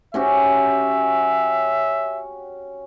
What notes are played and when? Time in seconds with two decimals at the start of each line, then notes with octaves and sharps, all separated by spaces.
0.14 C#4 F#4 G4 E5